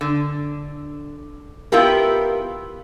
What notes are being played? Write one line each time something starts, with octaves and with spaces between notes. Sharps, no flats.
D3
B3 E4 F4 G4 A#4